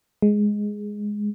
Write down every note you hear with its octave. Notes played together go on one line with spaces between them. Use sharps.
G#3